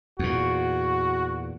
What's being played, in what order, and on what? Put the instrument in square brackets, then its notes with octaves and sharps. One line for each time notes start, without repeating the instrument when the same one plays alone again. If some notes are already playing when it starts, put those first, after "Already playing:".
[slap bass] E2 A#2 [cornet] F#4